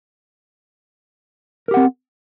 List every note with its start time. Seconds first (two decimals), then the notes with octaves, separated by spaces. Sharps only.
1.68 A#4
1.71 G4
1.74 F#5
1.77 C4